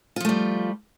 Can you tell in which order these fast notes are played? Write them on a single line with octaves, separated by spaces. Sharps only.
F4 F3 A3 G3